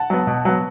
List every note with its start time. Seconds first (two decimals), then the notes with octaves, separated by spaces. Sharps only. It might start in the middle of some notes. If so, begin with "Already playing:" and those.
Already playing: F#5 A5
0.10 F#3 B3
0.27 B2
0.45 F#3 B3